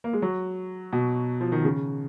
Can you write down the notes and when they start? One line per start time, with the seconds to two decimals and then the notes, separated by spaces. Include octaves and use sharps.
0.04 A#3
0.13 G#3
0.22 F#3
0.93 B2
1.41 F3
1.52 D#3
1.65 C#3